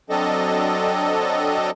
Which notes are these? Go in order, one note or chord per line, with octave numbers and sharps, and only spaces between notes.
F#3 C4 D4 A4 D#5